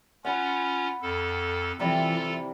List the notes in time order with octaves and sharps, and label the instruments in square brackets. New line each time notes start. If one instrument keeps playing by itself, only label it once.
[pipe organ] C#4 F4 [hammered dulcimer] F#5 B5
[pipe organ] F2 A4
[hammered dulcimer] C3 G3 [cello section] E3 [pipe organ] F4 A4